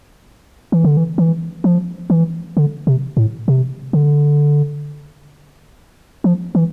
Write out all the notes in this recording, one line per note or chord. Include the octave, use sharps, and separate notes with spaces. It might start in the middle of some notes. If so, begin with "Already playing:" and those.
E3
D3
E3
E3
F3
E3
D3
C3
A2
C3
D3
F3
E3